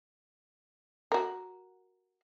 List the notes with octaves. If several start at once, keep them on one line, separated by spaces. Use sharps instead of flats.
F#4 A#4